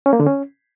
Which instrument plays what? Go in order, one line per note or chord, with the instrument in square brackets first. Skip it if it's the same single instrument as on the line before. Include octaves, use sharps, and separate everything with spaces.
[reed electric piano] C#4
A#3
D3
C#4